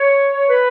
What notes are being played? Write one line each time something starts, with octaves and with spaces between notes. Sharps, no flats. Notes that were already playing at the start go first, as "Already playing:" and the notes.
Already playing: C#5
B4